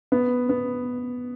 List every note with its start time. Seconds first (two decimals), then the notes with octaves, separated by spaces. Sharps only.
0.12 B3
0.49 B3